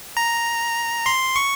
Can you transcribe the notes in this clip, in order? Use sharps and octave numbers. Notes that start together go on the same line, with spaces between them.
A#5
C6
C#6